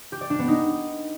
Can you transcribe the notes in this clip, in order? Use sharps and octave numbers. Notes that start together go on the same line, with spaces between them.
G4
D5
D4
B3
D#4